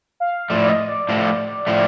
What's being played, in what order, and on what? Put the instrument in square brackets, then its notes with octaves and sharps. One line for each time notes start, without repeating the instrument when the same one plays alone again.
[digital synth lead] F5
[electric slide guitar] A2 F3 A3 [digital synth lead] D5
[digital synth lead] D#5
D5
[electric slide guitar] A2 F3 A3
A2 F3 A3